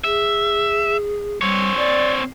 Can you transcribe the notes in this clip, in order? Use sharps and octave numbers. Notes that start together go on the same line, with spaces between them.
G#4 E5
G3 C4 C#5
D5